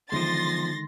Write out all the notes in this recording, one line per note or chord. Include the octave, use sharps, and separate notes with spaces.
E2 D3 D#3 F3 G#3 C6 A6 A#6